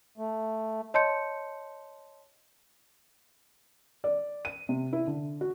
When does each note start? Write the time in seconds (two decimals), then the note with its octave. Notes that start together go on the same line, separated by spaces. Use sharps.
0.18 A3
0.94 C#5 D#5 A5 C6 G6 C#7
4.04 D5
4.45 D#7
4.69 C3
4.93 E4
5.07 D3
5.41 F#4